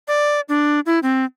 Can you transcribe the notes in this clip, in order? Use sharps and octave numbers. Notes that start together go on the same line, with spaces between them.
D5
D4
E4
C4